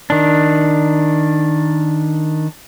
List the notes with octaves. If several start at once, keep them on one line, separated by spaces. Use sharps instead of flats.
D#3 D4